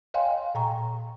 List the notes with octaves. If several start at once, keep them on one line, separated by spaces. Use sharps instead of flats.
C#5 D#5 F5 G5 G#5 C6
A#2 G5 A#5 C#6